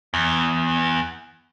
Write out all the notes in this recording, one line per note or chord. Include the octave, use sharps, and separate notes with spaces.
E2